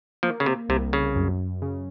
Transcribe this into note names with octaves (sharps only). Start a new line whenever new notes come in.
F3 A#3
C#3
C3
C2 C3
C#3
F#2
C#3